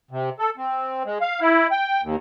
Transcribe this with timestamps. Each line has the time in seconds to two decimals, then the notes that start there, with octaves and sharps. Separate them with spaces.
0.11 C3
0.39 A4
0.57 C4
1.06 G#3
1.21 F5
1.41 E4
1.71 G5
2.03 D#2